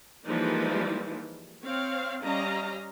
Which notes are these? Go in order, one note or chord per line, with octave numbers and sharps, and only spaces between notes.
E3 F3 G3 G#3 A#3 D#4
C4 C#5 F5
G3 C#4 D#5 F5 A#5